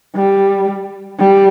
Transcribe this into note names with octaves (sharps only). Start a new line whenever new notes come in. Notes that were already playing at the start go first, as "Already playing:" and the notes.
G3
G3